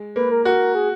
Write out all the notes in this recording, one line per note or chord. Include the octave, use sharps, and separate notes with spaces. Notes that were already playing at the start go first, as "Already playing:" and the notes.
Already playing: G#3
A#3 B4
A#4
F#4 A#4
G#4